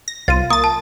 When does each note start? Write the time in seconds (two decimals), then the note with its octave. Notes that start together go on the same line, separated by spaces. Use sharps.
0.08 A#6
0.28 C2 F4 A6 D#7
0.51 A#3 D#6 A6
0.64 A5